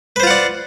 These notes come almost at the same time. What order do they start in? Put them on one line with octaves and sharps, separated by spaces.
B4 C5 F4 F#5 D5